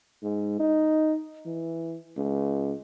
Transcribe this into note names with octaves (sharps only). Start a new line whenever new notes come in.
G#2
D#4
E3
C#2